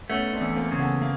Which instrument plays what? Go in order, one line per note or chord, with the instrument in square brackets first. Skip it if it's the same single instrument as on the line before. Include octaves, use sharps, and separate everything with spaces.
[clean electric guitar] A3 [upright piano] B3 C#4
[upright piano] C4 D4
[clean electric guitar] E2
[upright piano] A#3 C4
[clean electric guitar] C#3
[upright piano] A3 B3
A#3